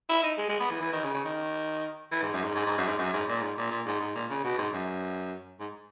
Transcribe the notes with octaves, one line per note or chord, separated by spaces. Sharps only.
E4
D#4
G#3
G#3
B3
E3
E3
D#3
C#3
C#3
D#3
E3
G#2
F#2
G#2
G#2
G#2
F#2
G#2
F#2
G#2
A#2
G#2
A#2
A#2
G#2
G#2
A#2
C#3
B2
G#2
F#2
G#2